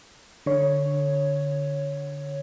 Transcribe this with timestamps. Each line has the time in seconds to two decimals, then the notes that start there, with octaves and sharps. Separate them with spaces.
0.46 D3 C#5